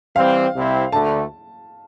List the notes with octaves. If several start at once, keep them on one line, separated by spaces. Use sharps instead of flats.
E3 G3 C4 F5
C2 C3 G3 C4 E4
D2 D3 A3 A5